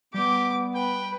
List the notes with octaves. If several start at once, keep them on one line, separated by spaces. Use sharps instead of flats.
G3 B3 G4 D6
B4 G5